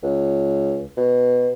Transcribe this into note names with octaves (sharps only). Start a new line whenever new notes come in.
C#2
B2